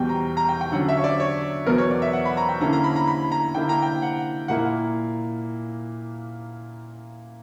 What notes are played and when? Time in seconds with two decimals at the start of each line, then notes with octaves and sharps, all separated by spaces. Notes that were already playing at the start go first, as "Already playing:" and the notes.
Already playing: E2 B2 G3 G5
0.09 A#5
0.37 A#5
0.49 G5
0.61 G5
0.72 D3 F#3 C#4 F#5
0.88 E5
0.97 C#5
1.04 D5
1.20 C#5
1.66 E2 B2 F#3 B3 A#4
1.78 C#5
1.91 D5
2.02 E5
2.13 F#5
2.25 B5
2.37 A#5
2.49 G5
2.60 D3 A#3 C#4 E4 A#5
2.73 A#5
2.84 B5
2.96 A#5
3.07 B5
3.32 A#5
3.55 D3 A#3 E4 G5
3.69 A#5
3.82 G5
4.02 F#5
4.48 A#2 A#3 E4 F#5